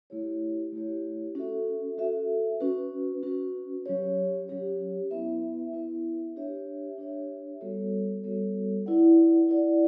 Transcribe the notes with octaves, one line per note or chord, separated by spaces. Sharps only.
A3 E4 G4 C#5
A3 E4 G4 C#5
C#4 F#4 A4 E5
C#4 F#4 A4 E5
C#4 F#4 B4
C#4 F#4 B4
F#3 C#4 G4 C#5
F#3 C#4 G4 C#5
B3 E4 B4 E5
B3 E4 B4 E5
D4 G4 C#5 E5
D4 G4 C#5 E5
G3 B3 F#4 A4 C#5
G3 B3 F#4 A4 C#5
E4 B4 D5 F#5
E4 B4 D5 F#5